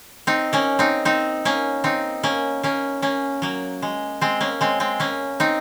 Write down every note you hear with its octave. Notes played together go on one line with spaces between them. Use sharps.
C4 D#4
A#3 C#4
C4 D#4
C4 D#4
A#3 C#4
C4 D#4
A#3 C#4
A#3 C#4
A#3 C#4
F#3 A#3
G#3
G#3 C4
A#3 C#4
G#3 C4
G#3 C4
A#3 C#4
C4 D#4